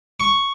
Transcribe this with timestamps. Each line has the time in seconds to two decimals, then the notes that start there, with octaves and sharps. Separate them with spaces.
0.20 C#6